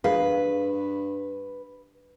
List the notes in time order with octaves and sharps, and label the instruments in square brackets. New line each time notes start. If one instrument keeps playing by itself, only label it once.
[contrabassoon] G2 [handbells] G#4 A#4 F5 [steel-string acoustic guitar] B4